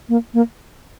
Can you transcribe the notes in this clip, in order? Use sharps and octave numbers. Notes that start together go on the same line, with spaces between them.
A#3
A#3